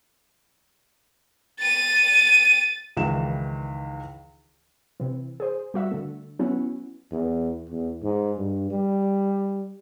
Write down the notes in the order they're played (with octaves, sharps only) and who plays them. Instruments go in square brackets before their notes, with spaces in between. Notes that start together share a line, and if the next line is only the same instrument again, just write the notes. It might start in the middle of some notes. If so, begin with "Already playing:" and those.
[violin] A6 D#7
[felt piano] C#2 D#3 E3 E7
[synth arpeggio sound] C3 E3
G#4 C5
G3 F#4 E5
D3 A3
F#3 B3 C#4 E4 F#4
[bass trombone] E2
E2
G#2
G2
G3